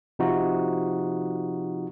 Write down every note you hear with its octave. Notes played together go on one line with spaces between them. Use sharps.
C3 F3 D#4 F4 F#4